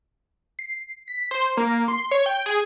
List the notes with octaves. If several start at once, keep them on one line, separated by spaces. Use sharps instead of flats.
C7
B6
C5
A#3
C6
C#5
G5
G#4